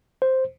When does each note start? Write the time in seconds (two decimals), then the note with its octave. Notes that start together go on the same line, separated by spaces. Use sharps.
0.22 C5